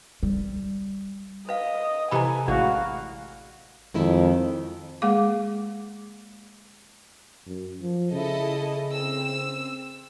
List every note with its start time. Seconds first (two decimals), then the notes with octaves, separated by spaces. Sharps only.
0.23 G3
1.49 B4 D#5 F5
2.11 C3 E3 A4 G#5 A#5 B5
2.48 A1 A2 G#3 F#4 D5 F5
3.94 F2 D#3 G#3 E4
5.02 G#3 A#3 G#4 F5 D6
7.46 F#2
7.82 F3
8.12 C#3 E4 A4 D#5
8.92 C4 E6